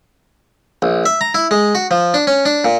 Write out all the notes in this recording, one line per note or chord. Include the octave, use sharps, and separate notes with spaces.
A#1
E5
A#5
E4
G#3
F#4
F3
D4
C#4
D4
A#2